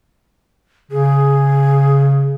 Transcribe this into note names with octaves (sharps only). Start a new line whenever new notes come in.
C#3 G#4